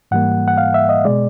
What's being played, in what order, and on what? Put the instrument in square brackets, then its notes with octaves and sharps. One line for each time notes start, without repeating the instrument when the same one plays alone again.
[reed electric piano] G#2 E3 G3 A#3 F#5
F#5
F5
E5
D#5
B2 G#3 D5